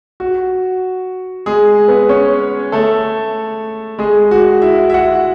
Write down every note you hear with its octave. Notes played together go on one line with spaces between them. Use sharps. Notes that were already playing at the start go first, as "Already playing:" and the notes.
F#4
G#3 G#4
B3 B4
C#4 C#5
A3 A4
G#3 G#4
F#4
E4 E5
E5
F#4 F#5